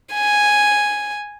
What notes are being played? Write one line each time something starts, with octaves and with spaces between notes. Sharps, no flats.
G#5